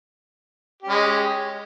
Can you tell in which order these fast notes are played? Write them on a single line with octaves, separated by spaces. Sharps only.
G4 C#4 G#3